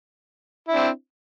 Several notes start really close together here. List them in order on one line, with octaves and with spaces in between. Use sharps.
E4 D4 C4